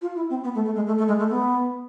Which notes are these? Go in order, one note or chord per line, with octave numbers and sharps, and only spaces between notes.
F4
E4
C4
B3
A3
A3
G#3
A3
A3
G#3
A3
B3